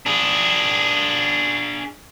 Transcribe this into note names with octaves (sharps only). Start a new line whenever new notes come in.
D4 G#4